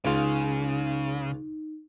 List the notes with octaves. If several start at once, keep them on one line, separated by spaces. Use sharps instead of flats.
C#2 C#3 D#4 F4